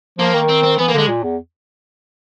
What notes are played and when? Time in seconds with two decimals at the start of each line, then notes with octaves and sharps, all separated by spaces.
0.18 F3 A#3
0.34 D#3
0.49 C4
0.63 C4
0.78 E3 B3
0.88 A#3
0.94 D3 G#3
1.08 A#2
1.23 E2